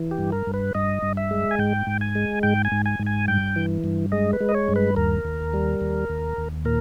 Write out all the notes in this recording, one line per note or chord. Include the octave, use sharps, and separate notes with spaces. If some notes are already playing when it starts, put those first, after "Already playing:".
Already playing: E3
G4
G2
A#4
G2
B4
G2 D#5
G2
E5
G#3
G#5
G#2 G5
G#2
G#5
G#3
G#2 G5
G#5
G#2
G#5
G#2
G#5
G2 G5
E3
G2
G#3 D#5
B4
G#3
D#5
C#5
G2
B4
D#2 A#4
D#2
G3
D#2
D#2
D#2
A#2 A#4